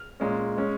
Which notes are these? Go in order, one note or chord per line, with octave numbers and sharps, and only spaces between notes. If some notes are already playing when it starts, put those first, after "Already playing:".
Already playing: F6
A#2 G#3 C#4
G#3 C#4